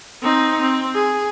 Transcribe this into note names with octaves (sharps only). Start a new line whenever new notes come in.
C4 D#4
C4
G#4